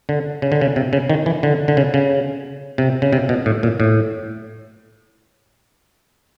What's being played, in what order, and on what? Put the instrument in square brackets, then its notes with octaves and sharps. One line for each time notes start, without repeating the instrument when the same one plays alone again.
[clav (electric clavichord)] D3
C#3
D3
C#3
C3
C#3
D#3
E3
D3
D3
C#3
C#3
C3
C#3
C3
B2
A2
A#2
A2